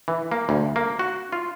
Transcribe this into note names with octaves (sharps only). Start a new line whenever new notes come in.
E3
A#3
D2
A#3
F#4
F4